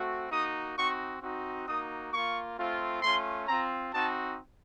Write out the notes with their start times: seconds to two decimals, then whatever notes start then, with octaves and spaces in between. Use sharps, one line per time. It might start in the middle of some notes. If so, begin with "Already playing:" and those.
Already playing: A3 C4 F#4
0.31 A#3 D#4 F#4 D#6
0.77 C4 D#4 F#4 C#6
1.21 C4 D#4 F#4
1.67 A#3 D#4 F#4 D#6
2.12 A#3 F4 C#6
2.57 A3 C4 F4
3.03 A3 C#4 F4 C6
3.48 C4 F4 A#5
3.94 C4 D#4 F#4 A5